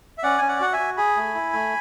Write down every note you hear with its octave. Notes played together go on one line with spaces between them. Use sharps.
E5
C#4 D5 F#5
C#4 G#5
D5 F#5
F#4 F#5
E5 G#5
F#4
G#4 G#5 B5
A3
E4
A3